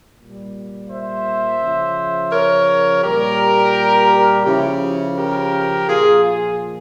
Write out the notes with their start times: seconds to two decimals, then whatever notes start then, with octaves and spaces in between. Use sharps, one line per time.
0.18 A#2 G3
0.90 C5 E5
1.60 C#3 F3
2.31 A#4 C#5
3.03 A#2 G3 G4 A#4
4.45 C#3 F3 E4 G4
5.16 G4 A#4
5.87 A#2 F3 F4 G#4
6.23 F4 G#4